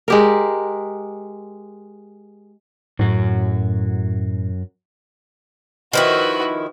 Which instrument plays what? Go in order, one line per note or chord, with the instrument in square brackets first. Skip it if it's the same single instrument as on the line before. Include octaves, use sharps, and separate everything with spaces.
[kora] G#3 G4 A#4
[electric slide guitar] F#2 F#4 [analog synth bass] A2
[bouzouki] D#3 F3 E4 [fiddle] F#4 B4